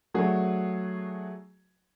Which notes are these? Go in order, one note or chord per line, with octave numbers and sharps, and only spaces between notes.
F#3 A3 D4 F#4 G#4